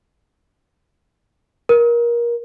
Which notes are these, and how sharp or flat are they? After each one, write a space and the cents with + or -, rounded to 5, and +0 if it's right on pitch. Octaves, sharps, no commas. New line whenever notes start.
A#4 +25